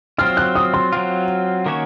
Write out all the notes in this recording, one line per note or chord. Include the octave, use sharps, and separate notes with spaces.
F#3 C4 F4 F6
F#6
D#6
C6
F#3 C4 F4
D#3 A#3 C#4 F#4 C#5